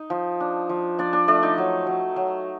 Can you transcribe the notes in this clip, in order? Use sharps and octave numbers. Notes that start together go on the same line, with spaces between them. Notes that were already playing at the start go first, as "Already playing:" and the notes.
Already playing: D#4 D#5
F3
D4
F3
F3 D4 D5
D4 D5
A3 D4 D5
D#4 D#5
F#3
F#3
F#3